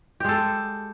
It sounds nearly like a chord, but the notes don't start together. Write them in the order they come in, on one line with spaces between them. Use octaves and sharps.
G4 G#3 A4